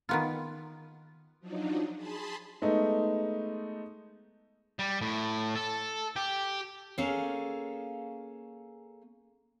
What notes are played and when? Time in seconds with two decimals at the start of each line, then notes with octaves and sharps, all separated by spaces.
0.09 D#3 B3 F4
1.40 F3 F#3 D4 D#4
1.95 G#4 A5 B5 C6
2.62 G#3 A3 B3 D#4
4.79 G3
5.02 A2
5.55 A4
6.16 G4
6.98 A#3 C#4 G#4 A4 F5